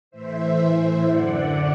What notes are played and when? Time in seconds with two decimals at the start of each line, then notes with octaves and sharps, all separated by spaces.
0.11 A2 E3 C5 E5
0.58 C5 E5
1.05 F#2 D3 D5 F#5